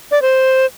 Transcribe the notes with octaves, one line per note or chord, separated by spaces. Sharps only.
D5
C5